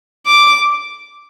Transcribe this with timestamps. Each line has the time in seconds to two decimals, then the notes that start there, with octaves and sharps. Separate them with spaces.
0.26 D6